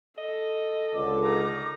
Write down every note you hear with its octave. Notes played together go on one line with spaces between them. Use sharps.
A4 D#5
C#2 D3 D6
D#3 A#5